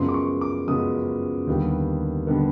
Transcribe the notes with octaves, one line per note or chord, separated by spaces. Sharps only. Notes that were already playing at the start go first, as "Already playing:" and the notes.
Already playing: F#2 C#3 F3 G#3 B3 C6
D6
C#6
D6
F#2 C#3 F3 G#3 B3 D#6
D#2 D3 G3 B3
D3 G3 B3